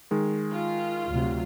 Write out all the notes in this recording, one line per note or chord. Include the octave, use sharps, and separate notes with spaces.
D#3 G#3 G#4
F4
D2 C3 F#3